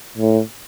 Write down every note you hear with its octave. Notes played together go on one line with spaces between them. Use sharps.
A2